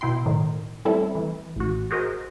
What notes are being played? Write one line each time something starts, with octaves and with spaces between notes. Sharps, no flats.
B2 E4 G5 C6
A2 D#3
G3 A3 C4 C#4 E4 A4
E3
A1 F#4
F#4 G#4 A#4 C5 D#5